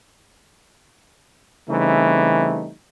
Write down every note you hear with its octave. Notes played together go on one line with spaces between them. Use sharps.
C#3 E3 G3 A3 C4 D#4